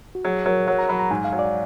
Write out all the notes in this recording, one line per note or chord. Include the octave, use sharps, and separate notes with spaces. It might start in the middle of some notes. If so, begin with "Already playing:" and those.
F#4
F#3 G#4
F#3 A#4
F#3 F#5
A#5
F#3 B5
A#5
G#2 G#5
F5
F#3
D5